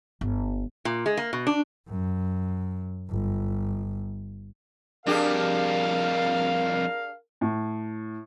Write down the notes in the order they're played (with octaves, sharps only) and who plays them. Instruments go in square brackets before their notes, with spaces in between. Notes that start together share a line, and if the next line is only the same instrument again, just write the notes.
[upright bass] G1
[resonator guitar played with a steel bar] A#2
G#3
A#3
B2
D4
[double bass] F#2
G1
[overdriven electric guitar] F2 G3 [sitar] D4 G4 G#4 [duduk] A#4 [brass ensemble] F5
[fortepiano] A2